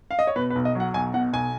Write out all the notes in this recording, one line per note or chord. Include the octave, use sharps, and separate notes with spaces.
F5
D#5
C#5
B2 B4
B4
B1
D#5
F#3
F#5
B1 G#5
B2 F#5
B1 G#5